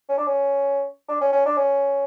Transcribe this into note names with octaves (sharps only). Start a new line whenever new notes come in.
C#4
D4
C#4
D4
C#4
C#4
D4
C#4